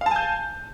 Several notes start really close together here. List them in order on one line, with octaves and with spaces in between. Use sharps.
F5 A5 G#5 G6